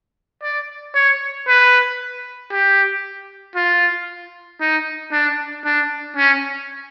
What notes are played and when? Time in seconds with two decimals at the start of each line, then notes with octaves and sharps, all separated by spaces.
0.43 D5
0.95 C#5
1.48 B4
2.51 G4
3.55 F4
4.61 D#4
5.12 D4
5.65 D4
6.17 C#4